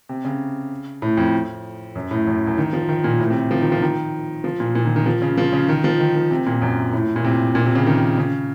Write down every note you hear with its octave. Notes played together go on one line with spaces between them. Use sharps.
C3
C#3
A2
F2
F#2
A2
F#2
F#2
D#3
F3
D#3
A#2
A2
C3
F3
D#3
F3
D#3
F3
A#2
A#2
D#3
D#3
F3
C#3
F3
C#3
D#3
F3
D#3
D#3
C3
A#2
F#2
A2
A#2
C3
A#2
C3
C#3
D#3
C#3